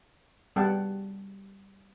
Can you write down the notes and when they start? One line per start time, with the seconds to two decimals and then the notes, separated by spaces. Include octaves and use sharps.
0.56 G3 B3 G#4 F#5 G5 A5